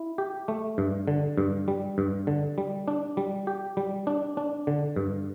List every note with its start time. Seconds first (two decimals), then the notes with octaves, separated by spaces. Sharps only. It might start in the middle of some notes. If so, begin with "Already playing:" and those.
Already playing: E4
0.18 G4
0.48 A3
0.78 G2
1.08 D3
1.38 G2
1.68 G3
1.98 G2
2.27 D3
2.58 G3
2.88 D4
3.17 G3
3.47 G4
3.77 G3
4.07 D4
4.37 D4
4.67 D3
4.96 G2